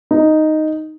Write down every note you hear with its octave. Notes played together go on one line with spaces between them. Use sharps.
D#4